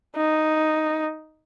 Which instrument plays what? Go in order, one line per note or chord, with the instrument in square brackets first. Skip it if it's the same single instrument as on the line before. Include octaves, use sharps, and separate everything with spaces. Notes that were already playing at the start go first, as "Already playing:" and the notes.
[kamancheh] D#4